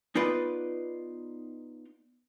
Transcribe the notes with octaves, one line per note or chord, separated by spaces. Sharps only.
B3 D#4 F4 B4 D5